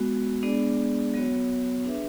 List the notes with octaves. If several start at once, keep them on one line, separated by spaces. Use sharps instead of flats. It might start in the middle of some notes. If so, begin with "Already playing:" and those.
Already playing: G#3 B3 F#4
G#3 B3 D4 G#4 D5
F#3 B3 F#4 C#5
D4 G#4 B4 E5